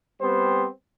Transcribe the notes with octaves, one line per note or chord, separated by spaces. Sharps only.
G3 B3 C4 C5